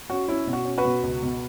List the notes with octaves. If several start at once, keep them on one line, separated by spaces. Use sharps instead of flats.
C#4 F#4
C#4 E4
B2
F#4
C#4
F#4 B4
B2
C#2
B2